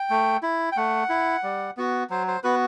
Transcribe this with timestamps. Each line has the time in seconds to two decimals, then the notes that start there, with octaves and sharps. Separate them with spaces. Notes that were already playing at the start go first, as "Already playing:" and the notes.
Already playing: G5
0.10 A3
0.43 E4
0.72 G5
0.77 A3 F#5
1.10 E4
1.43 G3
1.77 B3 F#4
2.10 F#3 C5
2.28 C5
2.44 B3 F#4 B4